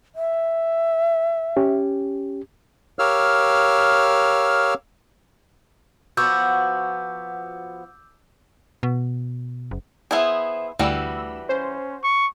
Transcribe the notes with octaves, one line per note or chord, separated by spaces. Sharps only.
E5
C#4 G4
G4 A#4 C#5 F5 E6 F6
F3 B3 F#4 D6 E6 G6
B2
F#1
B3 E4 G#4 C5 E5
D2 E3 G3 F#4 E6
C#4 C5
C#6